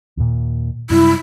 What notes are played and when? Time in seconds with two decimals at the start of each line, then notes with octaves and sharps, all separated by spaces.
0.17 D#2 A#2
0.90 F#2 C3 G3 E4